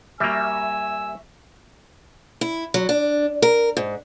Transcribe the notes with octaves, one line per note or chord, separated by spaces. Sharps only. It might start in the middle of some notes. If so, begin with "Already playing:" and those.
G3 A#3 E5 G#5 C#6 E6 A#6
E4
F#3
D4
A#4
G#2